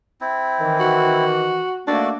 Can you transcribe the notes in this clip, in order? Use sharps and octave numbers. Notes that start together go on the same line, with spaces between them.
C4 E4
D#3 E3
F#4
D#3 A3 A#3 D4 F#4 A4 D5